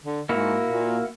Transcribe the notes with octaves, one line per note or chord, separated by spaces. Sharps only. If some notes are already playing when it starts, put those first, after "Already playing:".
D3
G#2 A#3 E4 F#4
A#2